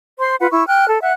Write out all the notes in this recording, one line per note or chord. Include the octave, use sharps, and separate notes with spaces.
C5 C6
F4 B4 F#5
E4 C#6
G5 F6 F#6
A4
E5 F#5 F#6